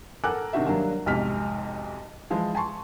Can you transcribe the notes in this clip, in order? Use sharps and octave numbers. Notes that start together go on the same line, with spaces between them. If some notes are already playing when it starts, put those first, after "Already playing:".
A4 A#4 F#5 G#5 D6 F#6
C3 D#3 D4 D#4 F#4 E5
F#3 G3 A#3 D4
B1 F2 G#2 C3 F6 B6
E3 F3 G#3 E4
G#5 A5 C6 C#6